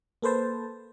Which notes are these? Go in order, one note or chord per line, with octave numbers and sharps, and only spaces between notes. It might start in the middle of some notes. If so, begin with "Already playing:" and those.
A#3 A4 B4 C5 A5